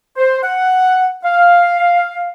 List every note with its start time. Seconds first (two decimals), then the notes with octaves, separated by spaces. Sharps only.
0.17 C5
0.43 F#5
1.24 F5